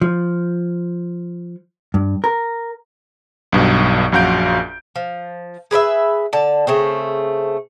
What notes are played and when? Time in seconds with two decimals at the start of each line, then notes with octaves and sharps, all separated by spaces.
0.01 F3
1.94 G2
2.24 A#4
3.52 B1 G2 B2
4.12 A#1 F#2 F#4 F5 G6 D7
4.96 F3
5.71 G#4 B4 D5 E5
6.33 D3 A5
6.67 C#3 A3 C4